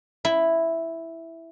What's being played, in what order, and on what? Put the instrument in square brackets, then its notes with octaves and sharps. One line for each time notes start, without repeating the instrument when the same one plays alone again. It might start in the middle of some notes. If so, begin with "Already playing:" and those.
[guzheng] E4